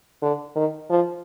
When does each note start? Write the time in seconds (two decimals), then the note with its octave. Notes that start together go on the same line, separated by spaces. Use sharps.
0.22 D3
0.56 D#3
0.90 F3